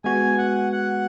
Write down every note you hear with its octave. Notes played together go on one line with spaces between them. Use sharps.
G#3 B3 F#4 G#5
F#5
F#5